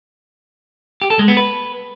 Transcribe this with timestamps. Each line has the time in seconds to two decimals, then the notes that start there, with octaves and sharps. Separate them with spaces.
1.02 G4
1.10 A4
1.19 G#3
1.28 B3
1.37 B4